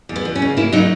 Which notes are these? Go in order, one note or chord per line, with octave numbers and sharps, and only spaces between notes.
E2
B3
E2
C#4
C#3
A#3 E4
F#3 D#4